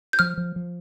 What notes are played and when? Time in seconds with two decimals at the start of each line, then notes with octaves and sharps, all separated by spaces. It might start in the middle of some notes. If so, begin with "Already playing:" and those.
0.13 G6
0.19 F3 F6
0.37 F3
0.56 F3